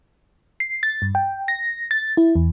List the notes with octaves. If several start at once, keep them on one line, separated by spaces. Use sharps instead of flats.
C7
A6
G2
G5
A#6
A6
E4
E2